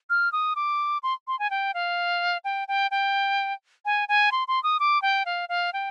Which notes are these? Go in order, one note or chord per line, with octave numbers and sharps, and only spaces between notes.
F6
D#6
D6
C6
C6
G#5
G5
F5
G5
G5
G5
G#5
G#5
C6
C6
D#6
D6
G5
F5
F5
G5